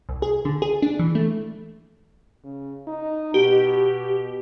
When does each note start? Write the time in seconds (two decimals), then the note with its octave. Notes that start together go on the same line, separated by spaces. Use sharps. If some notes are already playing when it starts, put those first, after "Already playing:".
0.09 C2
0.22 G#4
0.45 D3
0.62 G#4
0.82 D4
0.99 E3
1.15 A3
2.44 C#3
2.87 D#4
3.34 B2 G4